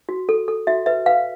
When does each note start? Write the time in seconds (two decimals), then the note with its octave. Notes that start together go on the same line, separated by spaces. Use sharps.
0.09 F#4
0.29 A4
0.48 A4
0.67 F#4 E5
0.86 B4 E5
1.06 B4 F5